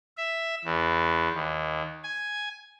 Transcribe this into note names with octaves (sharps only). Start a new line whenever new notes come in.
E5
E2
D#2
G#5